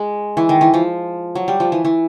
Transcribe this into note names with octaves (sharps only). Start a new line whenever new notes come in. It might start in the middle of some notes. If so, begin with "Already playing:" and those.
Already playing: G#3
E3
D#3
E3
F3
F#3
G3
F3
E3
E3